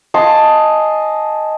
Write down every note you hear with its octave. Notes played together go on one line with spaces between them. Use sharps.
D#5 G#5 A5 C6